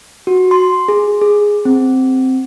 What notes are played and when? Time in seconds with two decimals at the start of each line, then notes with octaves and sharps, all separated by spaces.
0.27 F#4
0.51 C6
0.88 G#4
1.21 G#4
1.65 C4